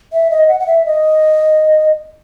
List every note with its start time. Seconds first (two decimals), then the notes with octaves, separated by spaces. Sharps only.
0.13 E5
0.31 D#5
0.48 F#5
0.60 F#5
0.67 E5
0.86 D#5